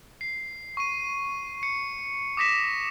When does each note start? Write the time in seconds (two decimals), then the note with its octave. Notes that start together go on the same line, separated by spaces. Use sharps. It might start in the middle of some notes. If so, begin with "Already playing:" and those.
0.21 C7
0.77 C#6 D#7
1.63 C#7
2.37 D6 D#6 A#6 B6 E7